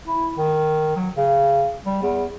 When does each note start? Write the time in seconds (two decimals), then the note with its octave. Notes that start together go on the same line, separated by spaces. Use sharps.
0.07 E4
0.38 D#3
0.96 F#3
1.17 C#3
1.86 G3
2.02 E2